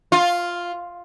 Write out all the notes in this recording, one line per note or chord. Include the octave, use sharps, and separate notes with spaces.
F4